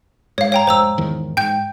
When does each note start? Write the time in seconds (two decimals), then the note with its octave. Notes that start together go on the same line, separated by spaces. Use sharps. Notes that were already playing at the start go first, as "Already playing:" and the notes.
0.38 G#2 C#5 F5
0.52 C#5 G5 A#5
0.67 F1 G#2 C5 A#5 E6
0.98 E2 G#2 D#3
1.37 G#2 G5 G6